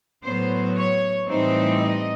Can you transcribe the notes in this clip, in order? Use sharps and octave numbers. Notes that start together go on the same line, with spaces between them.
A2 F#3 B3 C5
C#5
A2 E3 G3 C4 D#4 C5
D#5